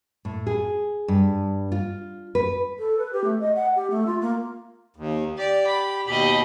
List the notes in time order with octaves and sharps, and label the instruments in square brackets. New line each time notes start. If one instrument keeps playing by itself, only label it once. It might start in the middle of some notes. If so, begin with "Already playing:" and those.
[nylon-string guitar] A2
G#4
G2
F4
B4
[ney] A4
B4
G4
A3
D#5
F#5
G4
A3
F4
A#3
[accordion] D#2
[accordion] G4 [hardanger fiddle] D5
[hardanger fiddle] B5
[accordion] D#2 B2 B5 [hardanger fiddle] G4 D#5